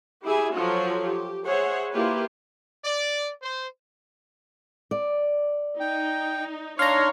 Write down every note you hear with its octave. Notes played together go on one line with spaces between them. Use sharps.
E4 G4 G#4 E5 G#5
F3 F#3 F4 F#4 A4 C#5
G4
G#4 C5 C#5 E5 F#5
A#3 E4 F4 G4 B4
D5
C5
D5
D#4 G5
D4 D#4 C#5 F5 A#5 C6